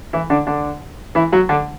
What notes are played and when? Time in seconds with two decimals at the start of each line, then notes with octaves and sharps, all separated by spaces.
0.13 E3 E4
0.30 D3 D4
0.47 D3 D4
1.15 E3 E4
1.32 F#3 F#4
1.49 D3 D4